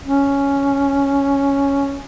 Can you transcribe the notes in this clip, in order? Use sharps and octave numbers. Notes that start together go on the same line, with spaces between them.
C#4